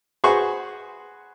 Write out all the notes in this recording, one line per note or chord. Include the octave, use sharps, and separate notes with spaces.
F#4 G#4 B4 C5 C#6